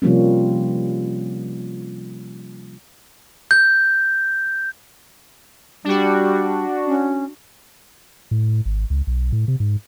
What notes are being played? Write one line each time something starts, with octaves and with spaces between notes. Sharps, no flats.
C3 F3 G3 A#3 C#4
G6
G3 D4 F#4
C#4
A2
G#1
C#2
B1
A2
C3
G#2